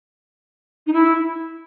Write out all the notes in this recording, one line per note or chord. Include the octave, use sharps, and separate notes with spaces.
D#4
E4